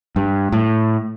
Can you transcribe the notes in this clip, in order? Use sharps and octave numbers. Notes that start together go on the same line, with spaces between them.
G2
A2